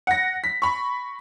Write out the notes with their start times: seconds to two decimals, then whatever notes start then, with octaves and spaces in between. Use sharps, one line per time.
0.07 F#5 A#6
0.44 B6
0.62 B5 C#6